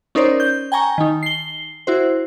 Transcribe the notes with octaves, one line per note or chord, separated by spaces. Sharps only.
C#4 D#4 A#4 C5 D5
G6
G5 G#5 A#5 C#6
D#3 D#4
C7 G7
E4 F#4 C5